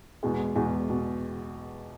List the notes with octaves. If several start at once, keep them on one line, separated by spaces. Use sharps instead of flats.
E2 B2 G#3
E2 B2 G#3
B2